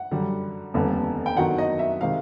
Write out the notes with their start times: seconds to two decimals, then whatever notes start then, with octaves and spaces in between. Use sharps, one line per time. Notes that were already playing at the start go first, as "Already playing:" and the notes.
Already playing: F#5
0.11 F#2 D3 G3
0.74 F1 D#2 D3 G3 B3
1.26 G5
1.37 G1 F#2 D#3 F#3 F#5
1.58 D#5
1.79 E5
2.01 C3 D#3 G#3 F5